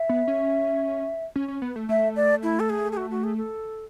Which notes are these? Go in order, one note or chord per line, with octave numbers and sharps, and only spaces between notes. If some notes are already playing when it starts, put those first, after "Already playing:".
Already playing: E5
B3
C#4
C#4
C#4
B3
A3
A3 E5
D5
E4
A4
G#4
G#4
F#4
F#4
G#4
A4